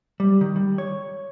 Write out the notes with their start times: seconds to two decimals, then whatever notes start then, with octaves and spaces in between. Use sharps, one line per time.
0.20 G3
0.41 D#3
0.56 G3
0.78 C#5